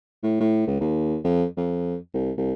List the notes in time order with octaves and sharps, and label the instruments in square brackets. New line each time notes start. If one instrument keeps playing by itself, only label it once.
[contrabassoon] A2
A2
C#2
D#2
F2
F2
C2
C2